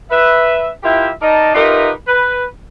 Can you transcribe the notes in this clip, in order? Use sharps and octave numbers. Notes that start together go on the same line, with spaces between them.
B4 E5
E4 F4 G4 A#4 E5 G5
D#4 A#4 D5 D#5 A5
D#4 F4 G4 A#4 B4 E5
B4